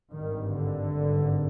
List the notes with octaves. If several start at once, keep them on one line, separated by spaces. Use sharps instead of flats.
G#1 G2 D#3
D3
G#1 G2